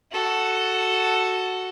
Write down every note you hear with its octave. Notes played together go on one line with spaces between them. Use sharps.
F#4 A4